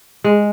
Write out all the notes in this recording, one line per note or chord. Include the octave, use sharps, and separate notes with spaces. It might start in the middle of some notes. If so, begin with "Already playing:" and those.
G#3